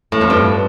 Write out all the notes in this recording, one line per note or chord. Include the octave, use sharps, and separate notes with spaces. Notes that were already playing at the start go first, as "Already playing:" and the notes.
A2
F2
G2